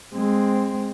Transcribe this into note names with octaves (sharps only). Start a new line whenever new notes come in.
G#3 C4